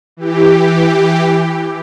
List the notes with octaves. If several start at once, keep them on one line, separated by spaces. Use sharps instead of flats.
E3 G4